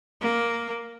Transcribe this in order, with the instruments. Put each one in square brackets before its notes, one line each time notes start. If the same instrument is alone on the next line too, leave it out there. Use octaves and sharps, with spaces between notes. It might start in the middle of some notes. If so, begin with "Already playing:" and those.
[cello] A#3